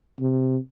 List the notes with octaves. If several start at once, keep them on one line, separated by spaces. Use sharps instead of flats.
C3